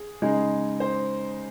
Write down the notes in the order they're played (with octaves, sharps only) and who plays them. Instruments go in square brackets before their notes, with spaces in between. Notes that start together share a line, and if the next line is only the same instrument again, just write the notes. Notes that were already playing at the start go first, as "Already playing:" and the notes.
Already playing: [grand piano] G#4
[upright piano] C#3 G#3 D#4
[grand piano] C5